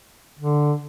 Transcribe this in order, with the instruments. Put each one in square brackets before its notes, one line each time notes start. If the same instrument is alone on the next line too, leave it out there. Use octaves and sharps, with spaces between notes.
[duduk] D3